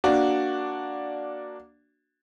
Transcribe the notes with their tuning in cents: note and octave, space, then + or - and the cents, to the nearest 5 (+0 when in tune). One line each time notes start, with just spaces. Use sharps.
A#3 +0 D4 +0 F#4 +0